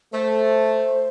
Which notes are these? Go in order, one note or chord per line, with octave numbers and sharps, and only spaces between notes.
A3 C5